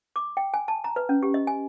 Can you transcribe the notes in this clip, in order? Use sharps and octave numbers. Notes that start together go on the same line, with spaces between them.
D6
G5
G#5
A5
A#5
B4
C#4
G4
D#5
G#5